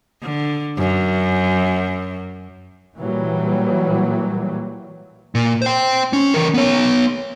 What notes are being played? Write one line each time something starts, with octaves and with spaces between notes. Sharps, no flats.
D3
F#2
A#2 E3 F#3 G3
A#2
C5 G5
C#4
E3 A#4
B3 C#5